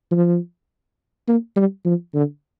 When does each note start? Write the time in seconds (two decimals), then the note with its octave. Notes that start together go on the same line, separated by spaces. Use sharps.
0.11 F3
1.27 A#3
1.56 G3
1.85 F3
2.14 D3